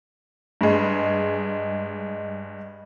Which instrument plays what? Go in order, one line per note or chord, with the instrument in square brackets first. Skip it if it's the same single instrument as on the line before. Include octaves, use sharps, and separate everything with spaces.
[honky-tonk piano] G2 G#3